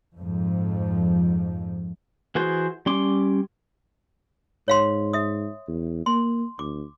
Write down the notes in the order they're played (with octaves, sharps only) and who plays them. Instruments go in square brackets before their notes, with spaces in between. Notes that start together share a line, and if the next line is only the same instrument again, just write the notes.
[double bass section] F2 G#2 F3
[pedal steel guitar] E3 F#4 G#4 C5
G3 C#4 C6 D6
[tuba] G#2 [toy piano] C#5 F5 C6
[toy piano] E5 D#6
[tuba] E2
[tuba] A#3 [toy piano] C6
[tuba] D2 [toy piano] D6